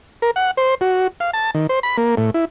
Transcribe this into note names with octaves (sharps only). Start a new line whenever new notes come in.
A#4
F#5
C5
F#4
F5
A5
D#3
C5
B5
A#3
A2
E4